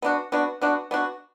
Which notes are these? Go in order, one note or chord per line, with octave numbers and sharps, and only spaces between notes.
B3 D4 F#4
B3 D4 F#4
B3 D4 F#4
B3 D4 F#4